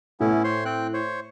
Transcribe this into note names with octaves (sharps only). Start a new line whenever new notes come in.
A2 B3 C#4 E4
C5 C#5 C6
C4 G5 F#6
C5 C#5